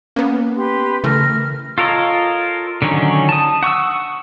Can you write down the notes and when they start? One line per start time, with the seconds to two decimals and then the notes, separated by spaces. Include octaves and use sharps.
0.16 A#3 B3 C#4
0.58 G4 B4 C6
1.04 C#3 E3 A3 A#4 F6
1.78 F4 A4 A#4 C#5 D#5
2.82 D3 D#3 F#3 C#4 D#4
3.29 A5 D#6
3.63 F#5 C#6 D#6 E6